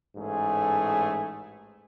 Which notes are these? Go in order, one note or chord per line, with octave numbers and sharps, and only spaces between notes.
A1 G#2 A3 G#4